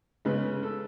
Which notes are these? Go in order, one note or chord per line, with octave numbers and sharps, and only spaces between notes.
C#3 G#3 B3 B4
A4